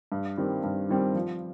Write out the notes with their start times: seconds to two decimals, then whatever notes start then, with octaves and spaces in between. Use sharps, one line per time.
0.12 G2
0.37 D#3 G3 C4
0.63 G2
0.89 D#3 G3 C4
1.15 F3